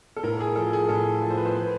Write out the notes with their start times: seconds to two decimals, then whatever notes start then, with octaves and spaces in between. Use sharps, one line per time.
0.16 A4
0.23 A2 A#4
0.40 G#4
0.56 F3 A4
0.73 G#4
0.89 A2 A4
1.22 F3
1.30 C5
1.38 B4
1.45 C5
1.55 B4